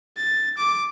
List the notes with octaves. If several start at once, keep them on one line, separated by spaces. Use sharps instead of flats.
A6
D6